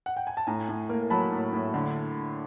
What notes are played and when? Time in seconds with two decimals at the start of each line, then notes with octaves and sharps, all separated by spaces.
0.06 F#5
0.16 G5
0.27 G#5
0.37 A5
0.47 A2 G#5 A#5
0.69 A2
0.89 A#3
1.10 F#3 A5 B5
1.32 A2
1.53 A2
1.74 D3